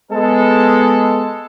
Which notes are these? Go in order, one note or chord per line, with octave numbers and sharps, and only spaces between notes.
G#3 B3 A4